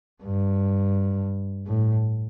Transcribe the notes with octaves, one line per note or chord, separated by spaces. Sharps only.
G2
A2